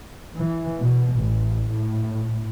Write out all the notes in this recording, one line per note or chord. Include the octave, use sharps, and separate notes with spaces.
E3
B2
A1
A2